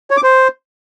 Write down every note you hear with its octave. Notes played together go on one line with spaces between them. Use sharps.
C#5
D6
C5